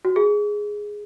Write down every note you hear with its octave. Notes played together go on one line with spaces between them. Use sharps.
F#4
G#4